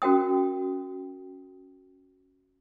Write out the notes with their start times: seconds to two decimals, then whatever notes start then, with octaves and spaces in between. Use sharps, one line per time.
0.02 C#4 F#4 A#4 G5 D#6